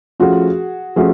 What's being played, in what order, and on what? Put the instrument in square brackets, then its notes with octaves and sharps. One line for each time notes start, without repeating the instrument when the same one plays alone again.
[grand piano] F3 A3 C#4 F4 [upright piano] F#4 G#4
[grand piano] F3 A3 C#4 [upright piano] F#4 G#4